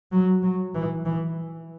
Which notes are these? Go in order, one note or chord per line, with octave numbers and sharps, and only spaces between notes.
F#3
F#3
E3
E3